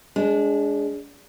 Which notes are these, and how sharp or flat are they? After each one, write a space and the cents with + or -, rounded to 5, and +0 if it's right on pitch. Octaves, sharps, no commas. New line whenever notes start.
G#3 +0 D4 -25